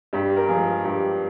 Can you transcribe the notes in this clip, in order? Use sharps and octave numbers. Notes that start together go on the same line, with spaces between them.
G2 G4
A#4
F3 G#3 G#4
G2 G4